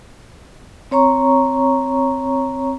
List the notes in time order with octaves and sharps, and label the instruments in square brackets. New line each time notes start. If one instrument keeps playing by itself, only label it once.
[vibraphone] C4 C#5 A#5 C#6